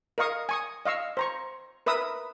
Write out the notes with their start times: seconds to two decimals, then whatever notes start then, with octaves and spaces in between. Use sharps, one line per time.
0.18 A#4 D#5 F5 C#6 D#6
0.49 G#5 C#6 D#6
0.85 D#5 F5 C#6 E6
1.17 C5 A#5 C#6
1.86 A#4 B4 E5 D#6 E6